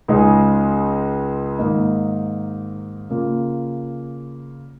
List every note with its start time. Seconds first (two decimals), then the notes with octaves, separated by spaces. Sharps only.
0.08 C#2 C#3 G#3 D#4 G#4
1.59 G#2 D#3 A#3 D#4
3.09 C#3 A#3 F4